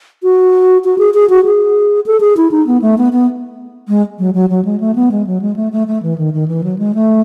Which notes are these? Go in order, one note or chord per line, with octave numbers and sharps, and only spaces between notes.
F#4
F#4
G#4
G#4
F#4
G#4
A4
G#4
E4
D#4
B3
A3
B3
B3
G#3
F#3
F#3
F#3
G#3
A3
B3
G#3
F#3
G#3
A3
A3
A3
E3
D#3
D#3
E3
F#3
G#3
A3